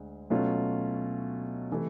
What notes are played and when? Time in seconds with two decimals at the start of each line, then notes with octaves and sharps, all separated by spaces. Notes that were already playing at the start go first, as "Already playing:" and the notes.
Already playing: D2 G#3
0.30 B2 F#3 A3 C#4 F4
1.71 C3 E3 A3